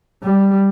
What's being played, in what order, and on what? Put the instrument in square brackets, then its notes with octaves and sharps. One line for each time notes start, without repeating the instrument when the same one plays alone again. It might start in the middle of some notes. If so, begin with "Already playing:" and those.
[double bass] G3